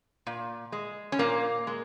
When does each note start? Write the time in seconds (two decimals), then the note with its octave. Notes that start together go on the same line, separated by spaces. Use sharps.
0.27 A#2
0.72 G#3
1.12 C#4
1.19 A#2 A#3
1.67 G#3